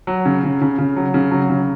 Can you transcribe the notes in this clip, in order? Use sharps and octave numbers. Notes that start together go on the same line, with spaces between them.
F#3
C#3
C#3
C#3
C#3
F#3
C#3
F#3
C#3